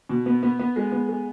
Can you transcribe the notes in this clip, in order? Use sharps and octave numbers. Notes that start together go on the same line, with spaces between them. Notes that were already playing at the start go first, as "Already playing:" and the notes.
B2
B3
B3
B3
G#3
B3
G#3